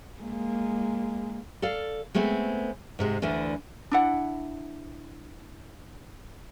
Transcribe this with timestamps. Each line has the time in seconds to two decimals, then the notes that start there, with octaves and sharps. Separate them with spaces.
0.21 G#3 A#3
1.62 A4 D5 F5
2.15 G#3 A3 B3 C4
2.99 G#2 C3 G#3
3.22 D2 D3 E3 D4
3.92 D4 E4 F#5